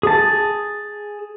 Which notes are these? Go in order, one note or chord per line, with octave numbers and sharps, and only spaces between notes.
G#4 A5